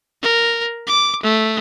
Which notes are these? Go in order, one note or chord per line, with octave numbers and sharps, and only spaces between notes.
A#4
D6
A3